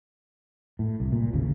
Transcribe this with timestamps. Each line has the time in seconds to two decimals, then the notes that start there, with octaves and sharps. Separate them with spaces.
0.79 A2
1.00 C2
1.12 A#2
1.33 A1 D#2 C#3